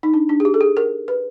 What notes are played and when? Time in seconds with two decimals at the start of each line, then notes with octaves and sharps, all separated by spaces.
0.03 D#4
0.14 D4
0.29 D4
0.40 G#4
0.45 G4
0.54 A4
0.61 G#4
0.77 A#4
1.08 B4